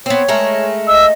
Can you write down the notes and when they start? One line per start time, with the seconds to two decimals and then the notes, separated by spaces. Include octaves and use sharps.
0.06 B3 C4 C#5
0.28 G#3 A3 A#4
0.87 D#5 E6